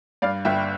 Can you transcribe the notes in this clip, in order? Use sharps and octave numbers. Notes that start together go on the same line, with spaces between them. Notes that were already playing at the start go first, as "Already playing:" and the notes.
G2 D5 F5
G1 E5 G5